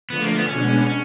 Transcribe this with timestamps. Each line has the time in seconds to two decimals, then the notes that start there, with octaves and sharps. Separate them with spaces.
0.10 D3 F3 A3 B3
0.23 A#3
0.36 B3
0.48 B2 G#3 B3 C#4 D4
0.87 C#4